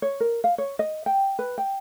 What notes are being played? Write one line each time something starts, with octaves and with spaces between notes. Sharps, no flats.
C#5
A#4
F5
C#5
D#5
G5
B4
G5